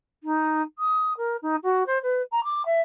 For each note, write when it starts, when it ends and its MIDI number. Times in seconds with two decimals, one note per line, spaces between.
0.24 0.62 63
0.79 1.13 87
1.18 1.37 70
1.42 1.56 63
1.64 1.84 66
1.87 1.99 72
2.03 2.22 71
2.32 2.43 82
2.44 2.63 86
2.66 2.81 76